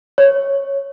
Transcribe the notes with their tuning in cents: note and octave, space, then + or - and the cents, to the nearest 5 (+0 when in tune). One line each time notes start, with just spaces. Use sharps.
C#5 -5